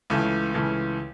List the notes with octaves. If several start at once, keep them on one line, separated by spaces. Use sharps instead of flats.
C#2 C#3 E3 A3
C#2 C#3 E3 A3